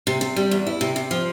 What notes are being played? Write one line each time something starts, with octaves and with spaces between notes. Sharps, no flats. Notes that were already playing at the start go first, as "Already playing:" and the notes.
C3
C3
G3
E2
E4
C3
C3
F3